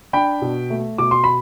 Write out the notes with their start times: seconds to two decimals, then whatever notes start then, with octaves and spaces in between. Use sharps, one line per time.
0.13 D4 G5 B5
0.42 B2
0.70 A3
0.98 B2 D6
1.11 C6
1.24 B5